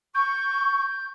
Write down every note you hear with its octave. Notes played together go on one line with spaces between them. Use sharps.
C#6 G6